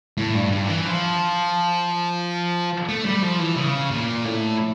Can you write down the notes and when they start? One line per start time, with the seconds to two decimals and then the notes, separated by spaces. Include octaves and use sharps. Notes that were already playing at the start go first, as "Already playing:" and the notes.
0.17 A2
0.35 G2
0.51 G2
0.64 D3
0.68 E3
0.85 F3
2.89 A3
3.06 G3
3.23 F3
3.40 E3
3.57 C#3
3.91 A#2
4.25 A2